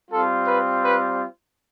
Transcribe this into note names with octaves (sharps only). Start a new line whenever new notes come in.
G3 C4 F4 A4
B4
B4